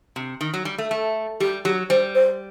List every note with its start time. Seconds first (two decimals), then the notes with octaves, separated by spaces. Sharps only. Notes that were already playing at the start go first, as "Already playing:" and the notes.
0.16 C3
0.41 D#3
0.54 F#3
0.65 G3
0.78 A3
0.91 A3
1.40 G3 G4
1.65 F#3 G4
1.90 G3 C5
2.15 C5